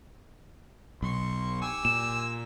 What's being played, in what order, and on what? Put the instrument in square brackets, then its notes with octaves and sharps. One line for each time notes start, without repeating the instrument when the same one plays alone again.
[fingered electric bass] B1 [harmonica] C6 C#6
[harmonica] G4 G#5 E6
[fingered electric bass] A#2 [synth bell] E7